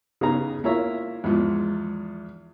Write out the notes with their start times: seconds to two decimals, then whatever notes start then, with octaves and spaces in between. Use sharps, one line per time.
0.21 C#3 B3 D#4 G#4 A#5
0.64 A#3 E4 F4 C#5 E5 A#5
1.24 E2 G#2 F3